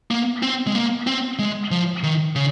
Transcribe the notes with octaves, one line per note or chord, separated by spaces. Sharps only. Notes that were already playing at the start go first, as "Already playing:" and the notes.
A#3
C4
G#3
A#3
C4
G#3
F3
D#3
C#3